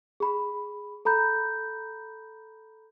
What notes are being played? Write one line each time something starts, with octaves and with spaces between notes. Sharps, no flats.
G#4 B5
A4 A#5 B5 G6